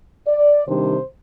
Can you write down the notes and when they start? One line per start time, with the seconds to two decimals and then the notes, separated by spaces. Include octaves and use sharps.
0.27 D5
0.66 C3 D#3 G3 D4 C5